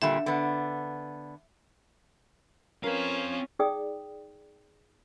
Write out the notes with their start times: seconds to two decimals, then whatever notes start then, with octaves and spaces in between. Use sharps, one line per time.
0.02 A#2 D3 G3 E5
0.26 D3 B3
2.84 C4 C#4 F4 A#4 B4 F5
3.59 D#4 G#4 D5 G5 D#6